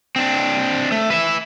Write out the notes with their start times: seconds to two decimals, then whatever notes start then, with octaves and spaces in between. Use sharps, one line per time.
0.16 C4 D4
0.92 A3
1.10 B4 E5